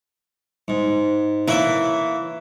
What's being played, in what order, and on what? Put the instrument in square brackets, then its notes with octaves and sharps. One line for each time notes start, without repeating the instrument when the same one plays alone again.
[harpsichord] G#2
[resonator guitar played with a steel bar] E3 [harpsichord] A#3 C#5 E5